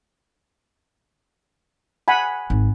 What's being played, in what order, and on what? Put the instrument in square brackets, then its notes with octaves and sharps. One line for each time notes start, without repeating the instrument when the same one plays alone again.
[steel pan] F#5 G#5 B5
[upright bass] G#1